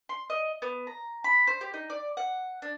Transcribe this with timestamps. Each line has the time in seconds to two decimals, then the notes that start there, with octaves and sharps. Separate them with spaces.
0.09 C6
0.30 D#5
0.62 B3
0.87 A#5
1.24 B5
1.47 C5
1.61 G4
1.74 D#4
1.90 D5
2.17 F#5
2.62 D4